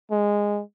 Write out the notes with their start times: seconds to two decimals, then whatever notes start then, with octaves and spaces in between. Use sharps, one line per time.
0.11 G#3